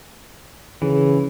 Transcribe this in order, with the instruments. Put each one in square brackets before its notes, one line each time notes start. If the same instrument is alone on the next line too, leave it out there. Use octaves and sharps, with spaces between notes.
[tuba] C#3 [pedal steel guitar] E3